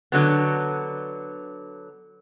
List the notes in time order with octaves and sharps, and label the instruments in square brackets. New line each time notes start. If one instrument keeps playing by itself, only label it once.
[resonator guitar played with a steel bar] D3 F#3 B3